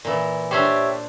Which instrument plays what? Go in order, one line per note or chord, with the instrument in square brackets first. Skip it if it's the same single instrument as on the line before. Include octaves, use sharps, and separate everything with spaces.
[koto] A#2 E3
[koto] D4 C5 [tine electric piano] G4 C#5 E5